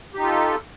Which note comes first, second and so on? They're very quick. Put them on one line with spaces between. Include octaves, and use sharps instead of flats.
G4 D#4 F4 A4